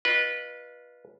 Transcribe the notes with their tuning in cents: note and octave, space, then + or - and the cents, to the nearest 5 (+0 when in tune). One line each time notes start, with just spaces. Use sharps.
F4 +0 B4 -20 D#5 -30